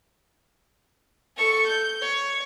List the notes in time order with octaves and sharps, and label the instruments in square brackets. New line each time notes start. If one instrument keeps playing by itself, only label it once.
[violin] A4 C#6
G6
C#5